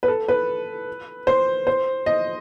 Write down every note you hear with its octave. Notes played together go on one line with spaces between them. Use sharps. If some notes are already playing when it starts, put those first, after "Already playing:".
B4
A4
B4
C5
C5
D#5